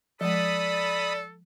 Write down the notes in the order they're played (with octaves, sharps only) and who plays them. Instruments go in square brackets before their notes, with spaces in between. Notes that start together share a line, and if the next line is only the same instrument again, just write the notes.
[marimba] F3 G#3 [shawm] A4 [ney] D5 [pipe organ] B5 D#6